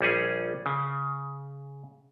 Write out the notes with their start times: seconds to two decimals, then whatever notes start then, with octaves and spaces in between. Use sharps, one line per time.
0.01 A#1 G3 C#4 G#4
0.66 C#3